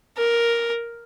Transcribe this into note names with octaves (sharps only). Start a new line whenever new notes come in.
A#4